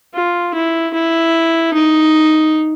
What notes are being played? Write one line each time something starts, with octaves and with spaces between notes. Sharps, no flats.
F4
E4
E4
D#4